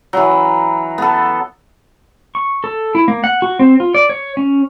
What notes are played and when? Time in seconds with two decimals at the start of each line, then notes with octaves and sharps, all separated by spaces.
0.13 E3 F#3
0.98 B3 A4
2.35 C#6
2.64 A4
2.95 E4
3.08 A#3
3.24 F#5
3.42 F#4
3.59 C4
3.80 F4
3.95 D5
4.09 C#5
4.37 C#4